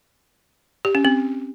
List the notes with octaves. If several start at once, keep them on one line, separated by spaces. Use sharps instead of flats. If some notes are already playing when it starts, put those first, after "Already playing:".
G4
C#4
C4